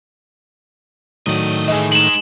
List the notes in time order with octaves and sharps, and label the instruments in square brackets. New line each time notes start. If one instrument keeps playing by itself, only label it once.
[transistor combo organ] A2 D#3 [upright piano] F#3 [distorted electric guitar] D5 D#5
[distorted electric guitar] E3 [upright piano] G#4 D#5
[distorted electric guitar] G#3 D#4 [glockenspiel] E7 F#7